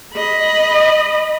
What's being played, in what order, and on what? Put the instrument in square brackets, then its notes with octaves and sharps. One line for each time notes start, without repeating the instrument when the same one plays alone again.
[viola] D#5 B5